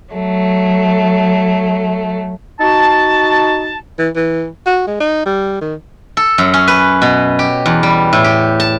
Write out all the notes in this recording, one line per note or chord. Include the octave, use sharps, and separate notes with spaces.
F#3 A3
D#4 F#4 A5
E3
E3
F#4
G#3
D#4
G3
D#3
A4
F#2
C#4
B4
B2
G4
E2
G3
A2
G4
A5